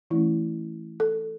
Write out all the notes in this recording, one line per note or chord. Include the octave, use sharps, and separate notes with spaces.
E3 A3 C#4 E4
A4